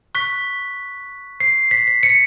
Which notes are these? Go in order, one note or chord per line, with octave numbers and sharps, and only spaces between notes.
C#6 F#6 B6
C7
B6
B6
C#7